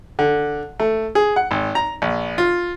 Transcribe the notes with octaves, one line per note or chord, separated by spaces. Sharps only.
D3
A3
G#4
F#5
G#1
A#5
A#1
F4